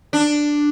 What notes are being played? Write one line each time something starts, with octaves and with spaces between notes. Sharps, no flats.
D4